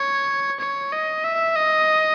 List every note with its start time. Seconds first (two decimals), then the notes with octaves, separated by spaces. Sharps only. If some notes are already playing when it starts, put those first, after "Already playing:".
Already playing: C#5
0.60 C#5
0.92 D#5
1.24 E5
1.56 D#5